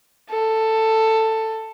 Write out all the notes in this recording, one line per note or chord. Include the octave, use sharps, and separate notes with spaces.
A4